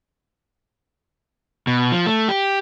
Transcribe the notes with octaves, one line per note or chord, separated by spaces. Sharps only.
B2
F3
A3
G4